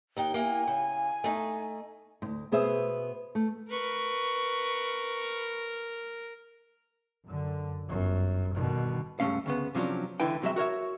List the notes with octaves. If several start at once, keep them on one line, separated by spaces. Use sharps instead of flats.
D#2 D#4 G5
A#3 E4 G#5
C#3
A3 D#4
D2 G#2
B2 B3 G#4 C5 E5
A3
A#4 B4 C#6
F#2 D3
G1 F#2
G2 B2 D3 D#3
C#2 G2 D#3 A3 C#4 F5
D2 C#3 B3
C3 F3 F#3 C#4 D4
C#2 D3 E3 E4 B4 G5
C3 F#3 G#3 E5
F#4 A#4 C#5 E5